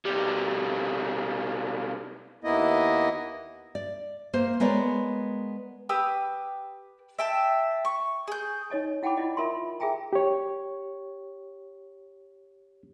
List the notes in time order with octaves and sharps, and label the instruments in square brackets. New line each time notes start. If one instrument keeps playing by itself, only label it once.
[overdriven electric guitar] B1 G3
[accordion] D#2 A#3 B3 E4 D#5
[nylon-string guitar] D5
A#3 C5
G#3 B3 A#4 C#5 D5
[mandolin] G4 B4 D#6 E6
E5 G5 A5
C#6
G#4 G6
[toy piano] D#4 C#5 D#5 A5
E4 F#5 G5 A5 B5 D6
E4 F4 D5 D#5
F4 A#4 E5 A5 B5 C6
G#4 A#4 E5 G5 G#5 A#5
[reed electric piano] G4 C#5